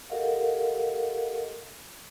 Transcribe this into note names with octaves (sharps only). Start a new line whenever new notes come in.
G4 A4 A#4 D#5 F5 F#5